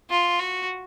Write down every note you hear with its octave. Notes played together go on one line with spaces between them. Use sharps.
F4
F#4